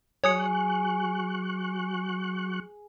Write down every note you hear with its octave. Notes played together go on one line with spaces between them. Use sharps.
F#3 G#4 C#5 C#6 D#6 F#6 C#7